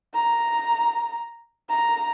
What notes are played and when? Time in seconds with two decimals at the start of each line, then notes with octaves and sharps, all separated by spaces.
0.15 A#5
1.70 A#5